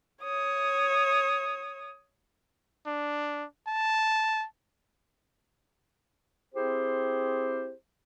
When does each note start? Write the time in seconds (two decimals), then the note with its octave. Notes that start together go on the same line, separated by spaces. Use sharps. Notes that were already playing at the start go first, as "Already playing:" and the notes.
0.23 C#5 D#6
2.87 D4
3.68 A5
6.54 C4 E4 G4 G#4 C5